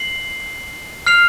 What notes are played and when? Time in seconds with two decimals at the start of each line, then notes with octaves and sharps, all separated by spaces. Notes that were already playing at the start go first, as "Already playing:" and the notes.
Already playing: C7 F#7
1.06 F6 C7 F7